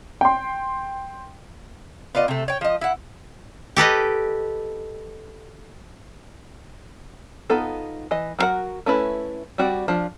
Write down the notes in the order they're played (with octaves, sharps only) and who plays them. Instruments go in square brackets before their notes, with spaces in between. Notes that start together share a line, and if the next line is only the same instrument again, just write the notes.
[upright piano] G5 C6
[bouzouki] B3 F4 D5 D#5
C3 A3
C#5 G5
F3 D#5
E4 F#5
[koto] G4 A4 B4 D#5
[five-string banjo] B3 D#4 F4 A4
E3 D#5
F#3 C4 F#4 A#4 F#5
A3 C#4 E4 B4
G3 C4 F#4 D5
F3 D4 F4